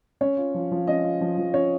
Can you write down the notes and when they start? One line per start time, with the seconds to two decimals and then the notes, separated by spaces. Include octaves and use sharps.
0.21 C#4 C#5
0.37 F4
0.54 F3
0.71 F3
0.87 C#4 D#5
1.04 F4
1.21 F3
1.38 F3
1.54 C#4 C#5